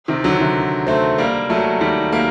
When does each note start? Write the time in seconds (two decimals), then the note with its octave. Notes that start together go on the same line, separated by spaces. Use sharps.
0.08 C3 D#3
0.24 D3 F#3
0.40 C3 D#3
0.87 A3 C4
1.18 G3 A#3
1.50 F#3 A3
1.81 D#3 G3
2.13 G3 A#3